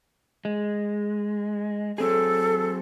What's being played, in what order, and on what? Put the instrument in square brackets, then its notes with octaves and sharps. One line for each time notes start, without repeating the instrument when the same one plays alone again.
[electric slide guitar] G#3
[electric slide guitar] F#3 C4 G#4 [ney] A4